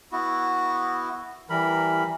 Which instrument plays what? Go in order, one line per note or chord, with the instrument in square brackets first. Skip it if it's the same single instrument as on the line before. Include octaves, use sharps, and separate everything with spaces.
[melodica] B3 E4 F#4
[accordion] E3 [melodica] G3 A#4 B5